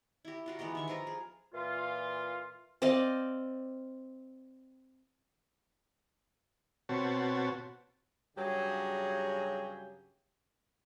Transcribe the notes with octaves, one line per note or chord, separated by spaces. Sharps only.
E4 G4
F4 F#4 A#4
E3 G#3 B3 G4
D#3 E5 C#6
F3 F4 A#4 A#5
G#4
A#2 E3 F4
C4 D5 D#5 F5
B2 C4 F#4 C#5 A5
G2 C#3 F#3 G4 G#4